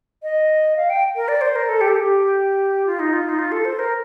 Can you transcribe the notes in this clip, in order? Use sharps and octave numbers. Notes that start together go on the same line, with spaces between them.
D#5
F5
G5
A#4
D5
C5
A#4
A4
G4
A4
G4
F4
D#4
F4
D#4
F4
A4
C5
A#4